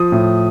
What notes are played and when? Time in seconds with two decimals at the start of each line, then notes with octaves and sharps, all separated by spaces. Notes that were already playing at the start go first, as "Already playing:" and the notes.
Already playing: F3 D#6
0.12 A2